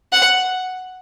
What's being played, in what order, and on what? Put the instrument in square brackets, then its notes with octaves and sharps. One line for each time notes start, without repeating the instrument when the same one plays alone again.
[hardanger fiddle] F#5